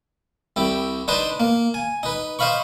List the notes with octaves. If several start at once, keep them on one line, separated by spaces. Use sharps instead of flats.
C2 E4 G4
D4 D#4 B4 C5 D#5 C6
A#3
G#5
D#4 B4
C5 D#5 F5 B5 C#6